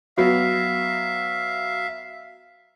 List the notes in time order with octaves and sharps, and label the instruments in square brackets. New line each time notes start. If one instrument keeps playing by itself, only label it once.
[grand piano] F#3 B3 F#4 [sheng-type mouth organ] E5 F5